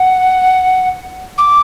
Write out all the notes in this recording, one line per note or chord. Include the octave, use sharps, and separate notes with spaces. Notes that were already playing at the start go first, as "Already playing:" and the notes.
Already playing: F#5
D6